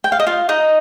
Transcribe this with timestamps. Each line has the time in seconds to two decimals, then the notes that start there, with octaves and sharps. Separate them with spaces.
0.04 G5
0.12 F5
0.20 D#5
0.27 F4 F5
0.49 D#4 D#5